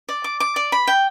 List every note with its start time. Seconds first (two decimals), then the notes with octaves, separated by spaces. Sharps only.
0.09 D5
0.24 D6
0.40 D6
0.56 D5
0.72 B5
0.87 G5